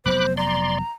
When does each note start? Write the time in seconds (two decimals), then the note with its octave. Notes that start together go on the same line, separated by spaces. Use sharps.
0.06 F1 F#3 B3 C5 B5 D6 F#6
0.37 D5 A#5 C6